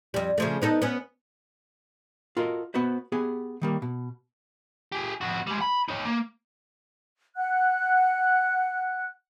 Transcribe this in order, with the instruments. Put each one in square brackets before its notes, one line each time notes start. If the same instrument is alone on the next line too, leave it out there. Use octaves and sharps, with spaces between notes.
[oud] F2 G3
C#3 F3 A3
B3 D#4 A4
B3 C#4
[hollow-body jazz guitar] F4 F#4 A4 A#4 D#5
B3 F#4 B4 C5
B3 G4 G#4 G#5
D#3 G3 A#3
B2
[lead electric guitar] G4 G#4
F2 F#4
G3 G#3
B5
D#4 C#5
A#3
[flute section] F#5 F#6